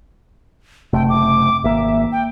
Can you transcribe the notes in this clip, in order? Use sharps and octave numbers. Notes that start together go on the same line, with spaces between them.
F#1 C3 A3 G5
D6
G#1 A#3 E5
G5